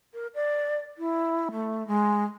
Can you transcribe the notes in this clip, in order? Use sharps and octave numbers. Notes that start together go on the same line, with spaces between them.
A#4
D5
E4
A3
G#3